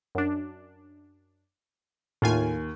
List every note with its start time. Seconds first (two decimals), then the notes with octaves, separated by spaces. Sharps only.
0.15 F#2 D4
2.22 D#2 A2 F4 G#5